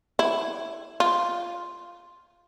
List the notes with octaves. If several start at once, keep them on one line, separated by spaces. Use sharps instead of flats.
E4
F4